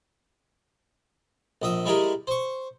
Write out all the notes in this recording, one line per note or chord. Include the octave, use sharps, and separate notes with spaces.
A#1 D#5 E5
G3 G#3 E4 G4 G#4 A#4
C5 C#6